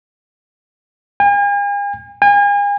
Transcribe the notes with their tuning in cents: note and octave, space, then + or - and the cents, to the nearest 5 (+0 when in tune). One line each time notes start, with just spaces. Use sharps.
G#5 -45
G#5 -40